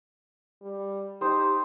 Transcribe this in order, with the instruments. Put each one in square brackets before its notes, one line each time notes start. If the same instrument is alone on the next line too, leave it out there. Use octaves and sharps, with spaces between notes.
[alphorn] G3
[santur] D#4 C5 [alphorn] G4